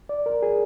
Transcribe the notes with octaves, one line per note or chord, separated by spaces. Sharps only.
D5
A#4
G#4